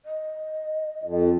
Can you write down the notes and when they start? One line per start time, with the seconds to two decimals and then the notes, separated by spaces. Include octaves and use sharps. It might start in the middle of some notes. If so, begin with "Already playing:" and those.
0.05 D#5
1.04 F2